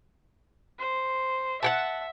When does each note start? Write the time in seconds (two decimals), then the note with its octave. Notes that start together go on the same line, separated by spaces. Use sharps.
0.79 C5
1.63 E5 F#5 G5 A5